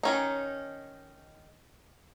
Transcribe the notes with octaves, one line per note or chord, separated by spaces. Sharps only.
D#3 C#4 D#4